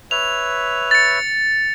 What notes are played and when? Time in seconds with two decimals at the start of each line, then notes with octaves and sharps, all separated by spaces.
0.11 B4 C#5 E5 F7
0.91 A6 C#7